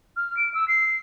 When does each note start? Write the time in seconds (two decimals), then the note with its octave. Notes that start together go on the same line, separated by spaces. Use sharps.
0.17 F6
0.37 D7
0.54 E6
0.68 C7